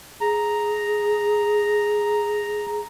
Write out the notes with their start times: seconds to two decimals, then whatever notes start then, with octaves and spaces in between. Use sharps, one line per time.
0.21 G#4 A#5